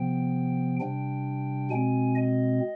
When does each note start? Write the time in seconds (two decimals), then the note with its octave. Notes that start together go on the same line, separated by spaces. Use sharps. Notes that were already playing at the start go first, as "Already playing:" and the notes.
Already playing: C3 F3 B3 G5
0.80 C3 G3 D4 G5
1.70 B2 G#3 C4 G#5
2.15 D#5